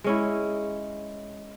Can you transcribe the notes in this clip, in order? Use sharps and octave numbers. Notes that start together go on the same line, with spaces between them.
G#3 C#4 E4